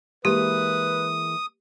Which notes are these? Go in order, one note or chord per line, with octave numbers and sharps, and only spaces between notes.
E3 G#3 A#3 G4 B4 D#6